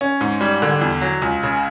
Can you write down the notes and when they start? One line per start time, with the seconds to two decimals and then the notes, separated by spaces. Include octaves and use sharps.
0.01 C#4
0.21 G#2
0.41 G3
0.62 D3
0.81 E2
1.02 F#3
1.22 C#2
1.43 C#3